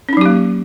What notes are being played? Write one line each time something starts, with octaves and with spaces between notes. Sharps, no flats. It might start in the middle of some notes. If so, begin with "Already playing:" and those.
F#3 A#3 C#4 D#4 G4